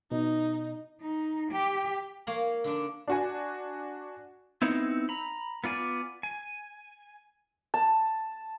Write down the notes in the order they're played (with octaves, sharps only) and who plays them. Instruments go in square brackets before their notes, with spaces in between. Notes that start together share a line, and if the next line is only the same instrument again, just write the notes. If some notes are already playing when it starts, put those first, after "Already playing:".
[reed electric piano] B2 [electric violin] D#4 [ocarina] D#5
[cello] D#4
G4
[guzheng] A#3 C#5 F5 A#5
D3 D4
[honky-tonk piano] D4 F#4 G#5
[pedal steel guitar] B3 C4 D#4 E4
A#5 B5
B3 F4 D5 G#5
G#5
[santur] A5